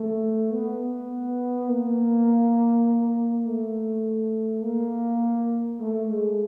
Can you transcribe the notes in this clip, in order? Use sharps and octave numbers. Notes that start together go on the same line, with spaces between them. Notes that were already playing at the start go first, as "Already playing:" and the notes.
Already playing: A3
B3
A#3
A3
A#3
A3
G#3